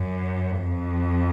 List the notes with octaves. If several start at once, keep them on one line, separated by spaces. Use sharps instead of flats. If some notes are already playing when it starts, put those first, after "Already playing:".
Already playing: F#2
F2